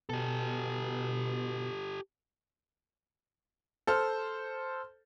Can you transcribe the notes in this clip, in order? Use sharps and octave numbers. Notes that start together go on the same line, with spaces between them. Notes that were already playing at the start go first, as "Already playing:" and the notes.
B2 G4 A4
A4 C5 F6